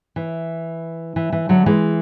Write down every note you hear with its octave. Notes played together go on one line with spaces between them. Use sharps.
E3
E3
E3
D3 F#3
E3 G#3